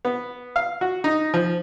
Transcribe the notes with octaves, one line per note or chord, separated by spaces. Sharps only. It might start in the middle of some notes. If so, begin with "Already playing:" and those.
B3
F5
F#4
D#4
F3